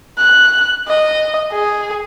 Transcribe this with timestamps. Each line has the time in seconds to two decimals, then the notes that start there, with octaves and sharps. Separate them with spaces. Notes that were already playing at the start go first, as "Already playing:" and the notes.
0.18 F#6
0.88 D#5
1.52 G#4